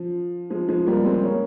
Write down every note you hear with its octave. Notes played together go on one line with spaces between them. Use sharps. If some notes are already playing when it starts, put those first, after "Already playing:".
Already playing: F3
F3 G#3
F3 G#3
G3 A#3
G#3 C4
A#3 C#4